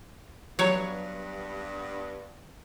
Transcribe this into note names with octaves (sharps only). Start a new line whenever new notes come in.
G2 F#3 B3 C#5